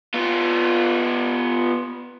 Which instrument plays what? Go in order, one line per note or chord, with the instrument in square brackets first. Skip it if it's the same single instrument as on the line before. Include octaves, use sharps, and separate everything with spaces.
[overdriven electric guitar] B3 F4